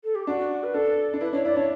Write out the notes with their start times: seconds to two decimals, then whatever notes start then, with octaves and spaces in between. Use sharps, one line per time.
0.04 A4
0.15 G4
0.27 D4 F#4
0.63 B4
0.74 D4 A4
1.14 D4
1.20 E4 B4
1.32 D4 C#5
1.45 E4 D5
1.56 D4 C#5